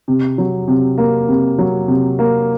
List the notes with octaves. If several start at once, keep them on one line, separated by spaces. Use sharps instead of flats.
C3
F#3
C3
A#3
C3
F#3
C3
A#3